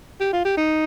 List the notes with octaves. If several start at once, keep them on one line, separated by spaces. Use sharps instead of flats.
G4
F4
G4
D#4